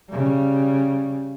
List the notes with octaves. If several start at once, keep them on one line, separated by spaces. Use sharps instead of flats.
C#3 G3